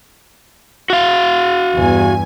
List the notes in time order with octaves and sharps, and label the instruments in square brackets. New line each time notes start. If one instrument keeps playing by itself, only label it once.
[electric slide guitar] F#4 F5
[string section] E2 G2 G#5